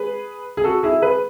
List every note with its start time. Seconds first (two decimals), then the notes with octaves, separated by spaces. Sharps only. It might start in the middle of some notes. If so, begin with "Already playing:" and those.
Already playing: G#4 B4
0.57 G#4
0.64 F#4 A4
0.83 E4 G#4
1.02 G#4 B4